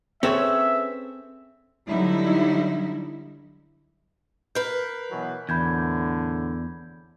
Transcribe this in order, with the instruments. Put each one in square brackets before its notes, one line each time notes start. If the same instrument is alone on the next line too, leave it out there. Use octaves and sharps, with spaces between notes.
[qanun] C4 [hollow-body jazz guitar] C#4 A4 C#5 [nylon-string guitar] G#4 B4 [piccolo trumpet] E5
[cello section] D3 F#3 G3 D#4 E4
[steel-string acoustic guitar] A#4 B4 [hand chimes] G6 C7
[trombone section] B2 E3 F#3
[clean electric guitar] E2 [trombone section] A2 D3 [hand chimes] B5 G6 G#6